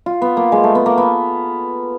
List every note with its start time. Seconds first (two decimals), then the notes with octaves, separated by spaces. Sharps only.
0.06 F4
0.22 B3
0.37 A#3
0.52 G#3
0.64 A3
0.75 B3
0.86 A#3
0.98 B3